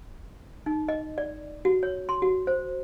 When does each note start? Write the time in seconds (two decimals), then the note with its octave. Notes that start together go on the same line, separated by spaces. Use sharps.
0.66 D#4
0.89 D#5
1.18 D5
1.65 F#4
1.83 C#5
2.09 C6
2.22 F#4
2.47 C5